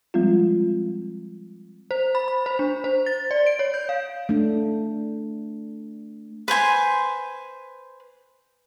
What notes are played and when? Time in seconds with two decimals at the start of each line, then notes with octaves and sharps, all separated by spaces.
0.14 F3 G3 G#3 C4 F4
1.91 C5
2.15 B5
2.28 B5
2.46 C5
2.59 D4
2.84 C5
3.06 A6
3.31 D5
3.47 D7
3.59 C#5
3.74 G6
3.89 F5
4.29 A3 D4
6.48 B4 C5 G#5 C6